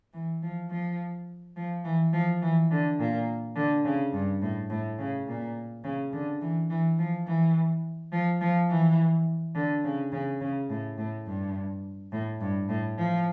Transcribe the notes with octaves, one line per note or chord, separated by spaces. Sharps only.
E3
F3
F3
F3
E3
F3
E3
D3
A#2
D3
C#3
G2
A2
A2
C#3
A#2
C#3
D3
E3
E3
F3
E3
F3
F3
E3
D3
C#3
C#3
C#3
A2
A2
G2
A2
G2
A2
F3